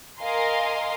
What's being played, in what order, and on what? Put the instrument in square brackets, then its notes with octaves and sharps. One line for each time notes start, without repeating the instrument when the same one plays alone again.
[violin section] A#4 D#5 F5 G#5 A#5 C6